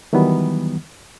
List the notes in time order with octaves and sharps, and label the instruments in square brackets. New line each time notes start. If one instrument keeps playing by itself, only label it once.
[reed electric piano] D#3 E3 F#3 G3 B3